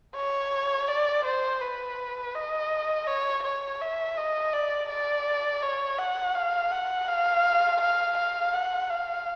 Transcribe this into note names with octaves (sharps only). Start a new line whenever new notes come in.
C#5
D5
C5
B4
D#5
C#5
C#5
E5
D#5
D5
D5
C#5
F#5
F5
F#5
F5
F5
F5
F#5
F5